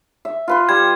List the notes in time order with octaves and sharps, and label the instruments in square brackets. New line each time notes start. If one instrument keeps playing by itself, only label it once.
[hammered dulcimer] E5
F4 B4 C6
[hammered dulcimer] G3 [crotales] G#6